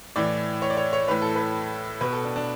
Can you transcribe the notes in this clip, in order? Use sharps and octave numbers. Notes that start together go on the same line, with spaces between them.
A2 E3 D5
C#5
D5
C#5
C#5
A2 E3 B4
A4
B4
B2 B4
A4
D4
D4